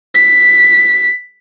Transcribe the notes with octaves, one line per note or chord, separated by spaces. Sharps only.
B6